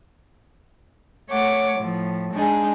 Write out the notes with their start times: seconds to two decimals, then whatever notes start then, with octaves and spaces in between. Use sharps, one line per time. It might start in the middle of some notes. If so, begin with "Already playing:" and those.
1.31 A3 C#5 F#5 D6
1.78 A2 F3
2.33 G#3 D4 D#4 G#4